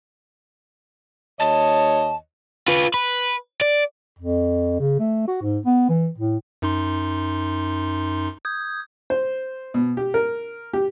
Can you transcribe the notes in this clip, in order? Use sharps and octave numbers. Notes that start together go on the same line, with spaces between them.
D#2 C#5 D#5 A5
F4 B4
B4
D5
F2
C#3
A3
F#4
G#2
B3
E3
A2
F#2 D#4 C6
D#6 G6 G#6
C5
B2
G4
A#4
G4